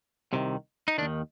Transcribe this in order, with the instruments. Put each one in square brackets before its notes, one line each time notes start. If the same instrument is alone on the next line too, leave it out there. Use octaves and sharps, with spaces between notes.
[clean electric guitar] C2 C3 D#3
D#4
D#3 D4
D#2